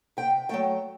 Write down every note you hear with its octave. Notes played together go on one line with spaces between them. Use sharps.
C3 G5
F#3 A3 G5